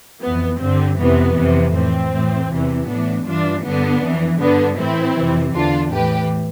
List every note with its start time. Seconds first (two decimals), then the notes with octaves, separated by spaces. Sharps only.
0.22 F2 E3 B3
0.60 G2 D3 C4
0.98 F2 C3 E3 B3
1.36 F2 C3 E3
1.74 A2 E3 C4
2.12 A2 E3
2.50 E2 C3 E3
2.88 A2 E3 B3 D4
3.27 G2 E3 D4 F4
3.64 G2 D3 B3 D4
4.02 F2 E3
4.40 G2 D3 B3 D4
4.78 A2 E3 C4 E4
5.16 F2 C3 E3
5.54 E2 D3 D4 F4
5.92 A2 E3 G4 B4